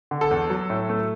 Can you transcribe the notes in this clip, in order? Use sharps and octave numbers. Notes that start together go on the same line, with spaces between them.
D3
A4
E2
F#3
A2
A3